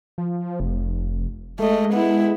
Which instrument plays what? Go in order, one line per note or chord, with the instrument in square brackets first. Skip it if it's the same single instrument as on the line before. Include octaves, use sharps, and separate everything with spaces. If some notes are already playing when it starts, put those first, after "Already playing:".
[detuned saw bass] F3
F1
[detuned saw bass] G#3 [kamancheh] A3 D#5
[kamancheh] B3 E4